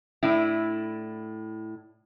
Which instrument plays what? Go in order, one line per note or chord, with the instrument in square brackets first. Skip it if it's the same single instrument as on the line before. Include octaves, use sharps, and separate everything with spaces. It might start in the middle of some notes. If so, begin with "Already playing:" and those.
[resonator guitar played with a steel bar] A2 D4 E4